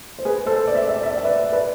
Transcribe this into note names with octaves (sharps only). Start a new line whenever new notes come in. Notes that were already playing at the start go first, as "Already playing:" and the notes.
C5
G#4 B4
A4 C5
D5
E5
D5
E5
D5
E5
D5
E5
B4 D5
B4 D5